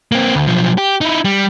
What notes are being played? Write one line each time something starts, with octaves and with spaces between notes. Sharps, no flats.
A#3 C4
D2
B1 F3
G4
D#4 E4
G3